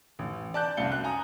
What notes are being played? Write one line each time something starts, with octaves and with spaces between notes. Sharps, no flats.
A1
D5 A5 F#6 G6
C2 F#2 F5 A5 C#7 G7
F#6
G#5 A#5 D#6